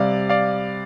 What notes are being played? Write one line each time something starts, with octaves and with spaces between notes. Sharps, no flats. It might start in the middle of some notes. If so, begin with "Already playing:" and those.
Already playing: C3 G3 D5 F5
D5 F5